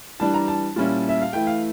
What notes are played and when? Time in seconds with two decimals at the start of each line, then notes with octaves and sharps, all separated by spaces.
0.20 E3 G3 D4 A5
0.34 A#5
0.48 A5
0.76 A#2 G3 C#4 E4
1.09 E5
1.22 F5
1.33 E3 A3 E4 G5
1.47 F5